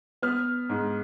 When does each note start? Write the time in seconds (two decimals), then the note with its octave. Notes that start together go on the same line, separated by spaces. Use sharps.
0.22 B3 F6
0.69 G#2